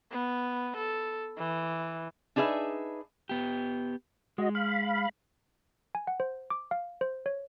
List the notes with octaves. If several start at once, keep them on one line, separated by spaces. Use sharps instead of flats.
B3
A4
E3
D4 D#4 G#4 B4 E5
B3 G4
G#3 F#4 D#5
F5 B5
G#5
F#5
C5
D6
F5
C5
C#5